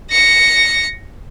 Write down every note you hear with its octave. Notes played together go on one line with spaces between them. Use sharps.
A#6 C#7